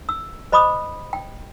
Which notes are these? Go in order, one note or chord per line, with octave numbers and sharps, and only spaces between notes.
E6
C5 D#5 B5 D6 D#6
G5